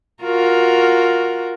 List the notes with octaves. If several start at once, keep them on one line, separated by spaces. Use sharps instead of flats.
F4 F#4 A#4